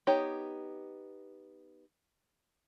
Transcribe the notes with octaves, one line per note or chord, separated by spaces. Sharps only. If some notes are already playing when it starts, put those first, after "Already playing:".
B3 D#4 G4 C#5